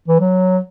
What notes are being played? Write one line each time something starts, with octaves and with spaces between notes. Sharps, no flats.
E3
F#3